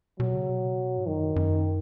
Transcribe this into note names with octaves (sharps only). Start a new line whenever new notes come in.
B2 F#3
C#3
B2
G#2
F#2 D#3
F#2